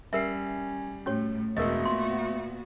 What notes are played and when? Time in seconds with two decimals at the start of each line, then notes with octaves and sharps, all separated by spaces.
0.13 G3 C#4 A#4 E5 C7
1.06 A2 C#4 F#4 C#5
1.57 E1 G#3 A3 B3 F#4 A#4 D#5
1.85 A#2 C6